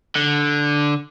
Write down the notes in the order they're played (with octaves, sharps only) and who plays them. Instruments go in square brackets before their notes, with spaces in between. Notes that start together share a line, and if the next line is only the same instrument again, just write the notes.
[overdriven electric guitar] D3